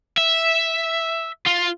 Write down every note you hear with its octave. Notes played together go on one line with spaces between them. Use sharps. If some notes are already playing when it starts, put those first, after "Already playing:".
E5
F4